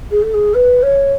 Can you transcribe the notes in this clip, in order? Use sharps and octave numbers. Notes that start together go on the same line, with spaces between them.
G#4
A4
G#4
B4
C#5